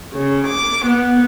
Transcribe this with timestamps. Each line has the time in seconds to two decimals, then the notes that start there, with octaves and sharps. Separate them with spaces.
0.13 C#3
0.47 D6
0.86 B3